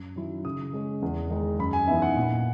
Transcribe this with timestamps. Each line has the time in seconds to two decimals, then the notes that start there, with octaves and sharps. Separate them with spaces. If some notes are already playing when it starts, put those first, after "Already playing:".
Already playing: F#2
0.16 D#3 F#3 C#4 E4
0.44 C#3 D#6
0.73 G#3 C#4
1.02 E2
1.30 D#3 G#3 D#4
1.59 F#2 B5
1.73 G#5
1.88 E3 B3 D#4 E5
2.02 F#5
2.16 A#2